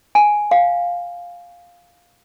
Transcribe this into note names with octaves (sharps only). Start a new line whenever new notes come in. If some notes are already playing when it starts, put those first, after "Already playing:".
G#5
F5